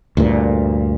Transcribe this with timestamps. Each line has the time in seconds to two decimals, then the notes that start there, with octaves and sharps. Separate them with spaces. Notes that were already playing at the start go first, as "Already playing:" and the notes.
0.17 D2 G2 A#2